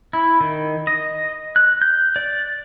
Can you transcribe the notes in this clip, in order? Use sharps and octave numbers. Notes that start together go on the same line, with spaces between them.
E4
D#3
D#5
F#6
G6
D5